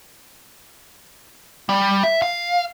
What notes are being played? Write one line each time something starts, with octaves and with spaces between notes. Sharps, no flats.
G3
E5
F5